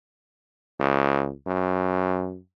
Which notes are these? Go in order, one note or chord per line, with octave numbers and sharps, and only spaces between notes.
C#2
F#2